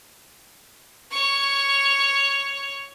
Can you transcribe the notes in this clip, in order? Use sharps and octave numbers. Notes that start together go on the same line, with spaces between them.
C#5 C#6